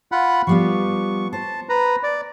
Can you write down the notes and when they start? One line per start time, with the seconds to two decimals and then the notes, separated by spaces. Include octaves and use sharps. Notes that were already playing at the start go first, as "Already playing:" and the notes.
0.12 F4 F#5 B5
0.47 F3 G3 B3 C#6
1.33 C5 A5
1.69 B4 A#5
2.03 D5